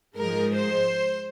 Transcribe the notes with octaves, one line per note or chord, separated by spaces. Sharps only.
G#2 F3 G#3 A#4
C5